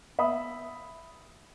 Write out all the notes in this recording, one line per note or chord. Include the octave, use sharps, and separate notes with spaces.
E5 B5 D#6